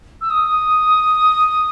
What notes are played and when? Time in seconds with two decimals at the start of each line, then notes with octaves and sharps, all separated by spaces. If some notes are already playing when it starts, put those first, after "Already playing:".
0.21 E6
0.30 D#6